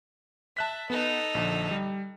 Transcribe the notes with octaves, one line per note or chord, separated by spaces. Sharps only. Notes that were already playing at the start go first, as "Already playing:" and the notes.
E5 A5 F#6 B6
B3 D#4 A4
A#1 D3
G3